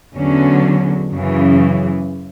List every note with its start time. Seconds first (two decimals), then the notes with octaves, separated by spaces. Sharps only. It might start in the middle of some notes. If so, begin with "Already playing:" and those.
0.17 E2 D3 F#3 C#4
1.12 F#2 C#3 E3